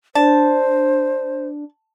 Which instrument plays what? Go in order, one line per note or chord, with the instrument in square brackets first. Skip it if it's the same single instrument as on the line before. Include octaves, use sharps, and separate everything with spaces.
[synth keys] D4 [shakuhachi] C5 [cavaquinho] A5